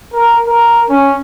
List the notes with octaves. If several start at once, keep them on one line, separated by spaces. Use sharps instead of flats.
A#4
A#4
C#4